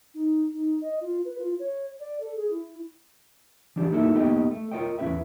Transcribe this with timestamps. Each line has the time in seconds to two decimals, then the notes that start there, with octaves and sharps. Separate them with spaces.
0.14 D#4
0.54 D#4
0.82 D#5
1.01 F4
1.25 B4
1.38 F4
1.59 C#5
2.00 D5
2.20 A4
2.36 G#4
2.50 E4
3.76 E3 D4 G4 D5
3.92 A#3 D#4 E4 F#4 A4 E5
4.15 A#3 B3 D#4 G4 D#5 G5
4.51 A3
4.71 F4 A#4 C#5 D#5 G5
4.98 E2 E3 C#4 G4 B4 E5